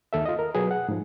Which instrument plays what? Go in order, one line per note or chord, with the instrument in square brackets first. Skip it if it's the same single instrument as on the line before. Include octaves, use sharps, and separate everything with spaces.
[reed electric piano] D#2 A4 E5
F4 D#5
A#4
B2 F#3 G#4 B4
F#5
G#2 F3